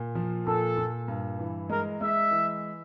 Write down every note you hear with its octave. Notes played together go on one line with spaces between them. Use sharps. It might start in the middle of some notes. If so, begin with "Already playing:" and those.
Already playing: A#2
F3
A#2 A4
A#2
G2
E3
G#3 A#4
G#3 E5
E3